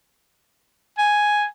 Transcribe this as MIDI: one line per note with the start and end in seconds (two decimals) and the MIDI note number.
0.98 1.45 80